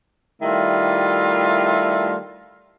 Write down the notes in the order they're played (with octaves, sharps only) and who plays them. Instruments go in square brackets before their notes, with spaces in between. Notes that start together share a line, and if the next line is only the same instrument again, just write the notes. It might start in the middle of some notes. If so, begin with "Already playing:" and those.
[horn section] D#3 G3 A3 E4 F4